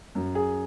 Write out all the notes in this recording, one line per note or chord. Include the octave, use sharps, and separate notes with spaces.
F#2
G#4